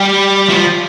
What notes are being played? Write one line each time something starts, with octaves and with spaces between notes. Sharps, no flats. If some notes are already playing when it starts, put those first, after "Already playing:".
Already playing: G3
F3